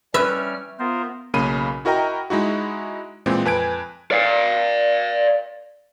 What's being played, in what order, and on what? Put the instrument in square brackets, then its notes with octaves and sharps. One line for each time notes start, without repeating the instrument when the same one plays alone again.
[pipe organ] G3 C#4 F6 [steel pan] B4 [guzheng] E5
[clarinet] B3 [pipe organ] F4 A#4 C5
[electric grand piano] B1 C#3 A#3 B5 D#7
E4 F#4 A#4 D#5 G5 A#5
G#3 D#4 E4 F#4
A#2 E3 G#3 C4
F2 B4 G#5 G#6 D7
[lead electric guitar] D5 F5